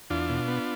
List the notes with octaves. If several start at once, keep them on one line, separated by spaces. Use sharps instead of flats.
E2 D4 F4
B2
B3